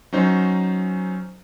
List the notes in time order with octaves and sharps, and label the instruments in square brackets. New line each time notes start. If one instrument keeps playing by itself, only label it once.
[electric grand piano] F#3 C#4 D#4 C5